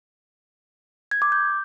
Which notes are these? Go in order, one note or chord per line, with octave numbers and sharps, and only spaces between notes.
G#6
D6
G6